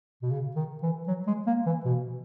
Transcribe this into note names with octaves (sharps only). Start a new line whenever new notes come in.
B2
C#3
D#3
E3
F#3
G#3
A#3
E3
B2